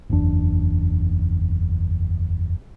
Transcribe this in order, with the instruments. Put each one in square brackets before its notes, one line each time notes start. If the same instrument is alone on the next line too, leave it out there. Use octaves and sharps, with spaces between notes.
[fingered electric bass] F#1 E2 D4